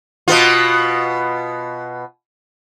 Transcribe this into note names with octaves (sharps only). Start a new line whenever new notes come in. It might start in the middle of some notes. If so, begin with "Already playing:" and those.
B2 B3 F4